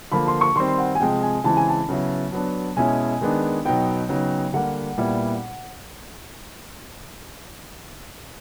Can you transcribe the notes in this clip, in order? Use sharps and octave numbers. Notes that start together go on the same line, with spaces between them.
D3 F3 A#3 B5
C6
C#6
D#3 G3 C4 C6
F#5
G#5
C3 F3 G#3 G5
G#5
C#3 E3 G#3 C4 E4 A5
G#5
A5
C#3 F#3 B3 E4
F#3 B3 D4
B2 G#3 C#4 E4 G#5
D#3 G#3 B3 D4
B2 F#3 B3 D#4 G5
C#3 F#3 B3 D#4
D3 G3 A#3 F#5
A#2 G3 B3 E4